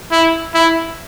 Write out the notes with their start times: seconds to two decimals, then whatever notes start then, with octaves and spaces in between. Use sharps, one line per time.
0.11 E4
0.55 E4